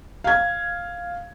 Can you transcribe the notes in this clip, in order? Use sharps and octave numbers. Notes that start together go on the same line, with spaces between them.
F5 G#6